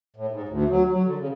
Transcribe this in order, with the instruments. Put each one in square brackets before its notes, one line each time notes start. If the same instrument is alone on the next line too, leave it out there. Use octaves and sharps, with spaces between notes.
[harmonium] A2
G#2
D2
F#3
F#3
D3
C#3